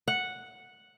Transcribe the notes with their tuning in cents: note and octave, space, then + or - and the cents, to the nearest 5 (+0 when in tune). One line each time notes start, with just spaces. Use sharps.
F#5 -5